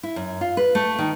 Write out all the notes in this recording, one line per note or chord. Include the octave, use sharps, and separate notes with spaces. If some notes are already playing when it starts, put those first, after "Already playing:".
E4
F#2
F4
B4
A3
D#3